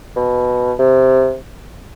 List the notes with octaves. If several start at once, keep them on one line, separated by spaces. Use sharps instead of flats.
B2
C3